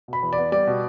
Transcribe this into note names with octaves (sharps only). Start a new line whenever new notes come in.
B2 B5
E2
D5
B3
G3 D5
B2